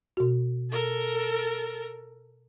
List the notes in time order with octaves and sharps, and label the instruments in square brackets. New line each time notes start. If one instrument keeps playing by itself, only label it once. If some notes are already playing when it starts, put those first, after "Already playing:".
[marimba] B2 F#4
[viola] A4 A#4